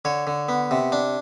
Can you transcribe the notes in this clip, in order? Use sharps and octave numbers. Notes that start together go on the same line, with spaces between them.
D3 C#5
D3
B3
C3
D4